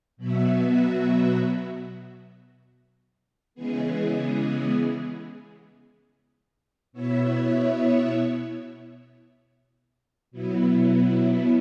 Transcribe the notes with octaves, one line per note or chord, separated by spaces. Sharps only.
B2 F#3 B3 F#4 E5
C#3 E3 G#3 B3 G#4
B2 B3 E4 C#5 E5
B2 F#3 B3 E4